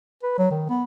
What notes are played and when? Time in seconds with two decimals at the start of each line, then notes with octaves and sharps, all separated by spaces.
0.23 B4
0.38 F#3
0.51 D#3
0.69 B3